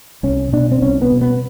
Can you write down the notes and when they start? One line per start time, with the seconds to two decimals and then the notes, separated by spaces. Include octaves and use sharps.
0.23 C2 C#4
0.53 B2 D4
0.71 C4
0.82 C2 C#4
1.02 B3
1.12 B2
1.21 B3